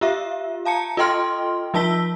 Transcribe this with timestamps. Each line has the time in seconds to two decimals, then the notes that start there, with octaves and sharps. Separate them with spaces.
0.01 F4 G4 E5 F5
0.65 F5 A5 A#5 C#7
0.97 F4 A4 D#5 G5 C6 F6
1.74 F3 F4 A5 E6 B6 G7